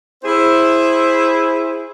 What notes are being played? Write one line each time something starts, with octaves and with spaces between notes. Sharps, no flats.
E4 G#4 C5